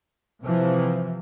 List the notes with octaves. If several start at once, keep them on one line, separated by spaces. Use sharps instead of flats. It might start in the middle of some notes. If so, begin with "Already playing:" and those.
C3 E3 F3